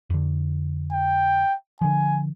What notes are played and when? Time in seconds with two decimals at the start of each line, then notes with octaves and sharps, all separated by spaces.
0.10 F2 D3
0.92 G5
1.81 D3 F3 G#5